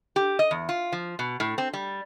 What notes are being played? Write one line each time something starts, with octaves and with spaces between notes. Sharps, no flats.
G4
D#5
E2
F4
F3
B2
A2
C4
G3